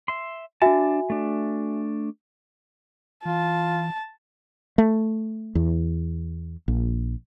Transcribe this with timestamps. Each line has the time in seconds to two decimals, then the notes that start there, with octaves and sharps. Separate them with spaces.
0.08 E5 C6
0.62 D4 F#4 E5 G#5 A5
1.10 A3 D4
3.25 E3 F4 A5
4.78 A3
5.55 E2
6.68 A#1